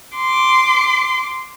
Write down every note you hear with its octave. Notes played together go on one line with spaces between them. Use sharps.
C6 D6